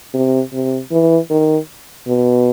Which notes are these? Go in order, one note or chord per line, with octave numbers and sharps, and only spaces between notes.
C3
C3
E3
D#3
B2